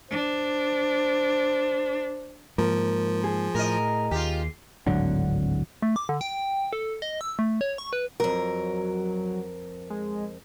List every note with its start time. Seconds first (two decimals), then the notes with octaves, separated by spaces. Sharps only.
0.11 D4 C5
2.58 G#2 F3 A#3 A#4
3.24 G#4
3.55 A2 A#4 D#5
4.11 D#2 F4 G4
4.86 D1 G#1 D3 F#3
5.82 A3
5.96 D6
6.09 D3
6.21 G5
6.73 A4
7.02 D#5
7.21 E6
7.39 A3
7.61 C#5
7.78 C#6
7.93 B4
8.20 F2 F#3 A#4
9.90 G#3